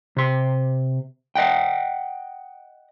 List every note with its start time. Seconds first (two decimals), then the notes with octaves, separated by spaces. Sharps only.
0.17 C3 C6
1.35 D#5 F#5 G5